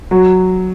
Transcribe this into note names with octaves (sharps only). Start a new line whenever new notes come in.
F#3